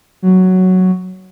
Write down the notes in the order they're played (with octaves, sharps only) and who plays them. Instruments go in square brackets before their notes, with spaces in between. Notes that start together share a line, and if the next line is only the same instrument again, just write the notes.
[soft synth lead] F#3